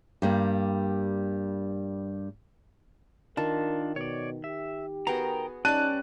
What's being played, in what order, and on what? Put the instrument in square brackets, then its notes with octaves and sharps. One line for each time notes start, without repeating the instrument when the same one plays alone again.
[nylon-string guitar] G2 G3 A#3
[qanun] D#3 [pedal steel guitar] D4 F4 A5 [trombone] A#4
[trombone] B2 [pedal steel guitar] C#5 D5
[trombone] G4 [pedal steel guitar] E5
[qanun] B3 F#4 G#4 [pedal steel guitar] A#4 G5 A#5
[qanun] G3 D5 [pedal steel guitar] C#4 [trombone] D#4 [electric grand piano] A5 F#6 D#7